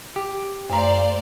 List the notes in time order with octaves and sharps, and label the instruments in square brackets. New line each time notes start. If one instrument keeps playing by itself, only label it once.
[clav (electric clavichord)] G4
[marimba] F#2 A#5 [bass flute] A3 [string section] C5 D5 F5